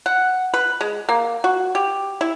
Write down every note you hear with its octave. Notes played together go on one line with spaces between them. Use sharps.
F#5
B4
G#3
A#3
F#4
G4
E4